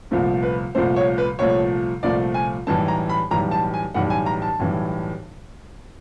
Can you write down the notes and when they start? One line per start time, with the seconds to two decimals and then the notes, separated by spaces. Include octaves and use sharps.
0.11 C2 A#2 F3 A3
0.43 B4
0.75 C2 A#2 F3 A3 C5
0.96 C#5
1.18 B4
1.39 C2 A#2 F3 A3 C#5
2.03 C2 A#2 F3 A3 D5
2.34 G#5
2.67 B1 A2 E3 G3 A5
2.88 A#5
3.10 B5
3.31 B1 A2 E3 G3 A#5
3.51 A5
3.74 G#5
3.94 B1 A2 E3 G3 F#5
4.10 G#5
4.26 A#5
4.42 A5
4.59 B1 A2 E3 G3